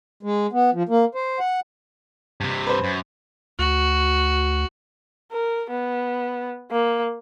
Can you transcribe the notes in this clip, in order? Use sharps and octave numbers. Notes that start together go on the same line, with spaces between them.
G#3
B3
F3
A#3
C5
F#5
G2 C3
B4 C5
F#2
D2 F#4
A#4
B3
A#3